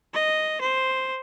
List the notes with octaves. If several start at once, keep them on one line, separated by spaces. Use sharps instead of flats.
D#5
C5